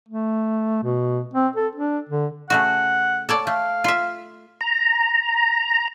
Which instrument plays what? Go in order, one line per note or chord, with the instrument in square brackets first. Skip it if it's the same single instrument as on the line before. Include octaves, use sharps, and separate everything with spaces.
[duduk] A3
B2
C4
A4
D4
D3
[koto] C#3 A3 F#4 [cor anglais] F#5
[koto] A4 C#5 D5
[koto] A3 [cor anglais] F5
[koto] F4 E5
[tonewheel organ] A#5